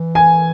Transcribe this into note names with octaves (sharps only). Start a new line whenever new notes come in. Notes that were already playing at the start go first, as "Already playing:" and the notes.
Already playing: E3
G#5